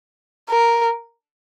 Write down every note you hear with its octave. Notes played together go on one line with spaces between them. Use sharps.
A#4